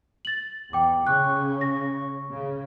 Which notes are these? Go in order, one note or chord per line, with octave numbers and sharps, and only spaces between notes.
A6 F#7
E2 G5 D6
C#3 C#6 F#6
A#6
C#3